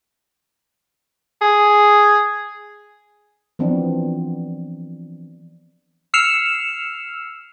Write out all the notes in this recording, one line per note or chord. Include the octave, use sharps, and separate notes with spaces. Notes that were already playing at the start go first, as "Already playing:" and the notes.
G#4
E3 F3 B3 C4 D4
E6 F6 C7 C#7 E7 F7